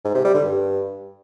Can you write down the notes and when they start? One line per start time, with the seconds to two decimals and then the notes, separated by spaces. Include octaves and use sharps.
0.04 G#2
0.14 C3
0.24 G3
0.35 D3
0.45 G2